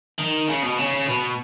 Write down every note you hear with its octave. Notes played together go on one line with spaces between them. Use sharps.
D#3
C#3
B2
C#3
B2